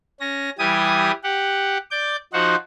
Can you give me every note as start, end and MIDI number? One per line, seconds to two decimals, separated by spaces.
0.20 0.50 61
0.20 0.50 94
0.59 1.11 52
0.59 1.11 55
0.59 1.11 67
0.59 1.11 80
0.59 1.11 87
1.23 1.78 67
1.23 1.78 78
1.91 2.16 74
1.91 2.16 86
1.91 2.16 91
2.33 2.55 53
2.33 2.55 63
2.33 2.55 66
2.33 2.55 72
2.33 2.55 78